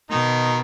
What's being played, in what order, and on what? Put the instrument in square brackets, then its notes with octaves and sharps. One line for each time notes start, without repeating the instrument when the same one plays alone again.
[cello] B2 [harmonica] D#3 D#4